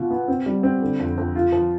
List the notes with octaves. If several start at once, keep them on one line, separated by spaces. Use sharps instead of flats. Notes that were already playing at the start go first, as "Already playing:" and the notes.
Already playing: B2 F4
B3
C4
G3
C4
D3
F2
F2
F4
F3